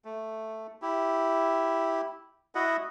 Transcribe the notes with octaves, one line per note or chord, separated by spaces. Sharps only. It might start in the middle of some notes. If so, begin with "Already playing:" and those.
A3
E4 G4
E4 F#4 D#5 F#5